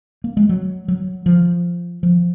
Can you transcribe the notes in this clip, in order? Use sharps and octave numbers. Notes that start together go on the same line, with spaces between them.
A#3
G#3
F#3
F#3
F3
F3